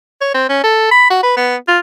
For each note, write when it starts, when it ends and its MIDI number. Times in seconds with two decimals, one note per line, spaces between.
0.21 0.32 73
0.34 0.47 60
0.49 0.64 61
0.64 0.87 69
0.91 1.06 83
1.10 1.19 66
1.23 1.34 71
1.37 1.56 59
1.68 1.79 65